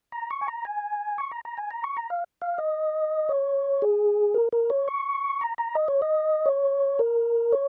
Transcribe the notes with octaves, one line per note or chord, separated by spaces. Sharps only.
A#5
C#6
G#5
A#5
G#5
C#6
A#5
A#5
G#5
A#5
C#6
A#5
F5
F5
D#5
C#5
G#4
A#4
A#4
C#5
C#6
A#5
A#5
D#5
C#5
D#5
C#5
A#4
C#5